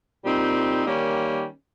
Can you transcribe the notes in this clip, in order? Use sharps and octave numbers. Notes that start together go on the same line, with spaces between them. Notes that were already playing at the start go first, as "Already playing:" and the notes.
A#2 G3 C4 D#4
D#3 G3 A#3 C#4